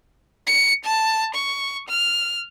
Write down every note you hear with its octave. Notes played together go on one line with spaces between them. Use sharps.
C#7
A5
C#6
F6